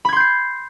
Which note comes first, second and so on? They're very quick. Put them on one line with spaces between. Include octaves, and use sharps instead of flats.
B5 G#6 C6 G6 C7